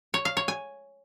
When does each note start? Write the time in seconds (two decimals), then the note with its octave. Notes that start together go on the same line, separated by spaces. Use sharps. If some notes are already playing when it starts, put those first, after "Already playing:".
0.14 C#5
0.25 F5
0.37 C#5
0.48 G#5